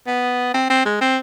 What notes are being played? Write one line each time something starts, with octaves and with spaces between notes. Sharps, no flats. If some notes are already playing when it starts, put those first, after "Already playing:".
B3
C4
C4
G#3
C4